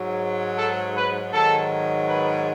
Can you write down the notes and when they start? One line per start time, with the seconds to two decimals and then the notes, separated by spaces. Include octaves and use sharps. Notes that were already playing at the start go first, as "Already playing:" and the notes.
Already playing: G#2 F#3
0.58 A4
0.96 B4
1.32 G#2 D#3 F#3 A4
2.07 B4